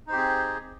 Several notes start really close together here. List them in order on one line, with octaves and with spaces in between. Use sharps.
D#4 C5 G4 C4 G#4